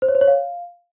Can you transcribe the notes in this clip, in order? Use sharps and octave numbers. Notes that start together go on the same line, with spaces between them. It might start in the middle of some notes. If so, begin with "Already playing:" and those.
C5
C#5
C5
C#5
F5